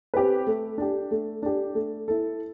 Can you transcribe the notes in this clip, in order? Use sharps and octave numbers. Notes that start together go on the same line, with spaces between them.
C4 G4 B4
A3
D4 G4
A3
D4 G4
A3
E4 A4